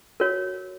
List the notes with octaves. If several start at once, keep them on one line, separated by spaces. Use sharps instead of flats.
F#4 A#4 C#5